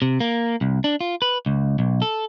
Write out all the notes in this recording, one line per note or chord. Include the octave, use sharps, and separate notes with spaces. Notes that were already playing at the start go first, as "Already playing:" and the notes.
C3
A#3
C2
D4
F4
B4
C#2
B1
A4